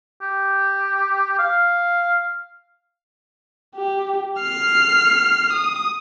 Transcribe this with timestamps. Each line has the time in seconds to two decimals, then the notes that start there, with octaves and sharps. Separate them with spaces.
0.22 G4
1.39 F5
3.75 G4
4.41 F6 C7
5.53 D#6